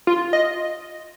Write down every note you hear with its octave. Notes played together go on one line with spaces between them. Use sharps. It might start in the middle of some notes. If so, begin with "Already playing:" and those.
F4
D#5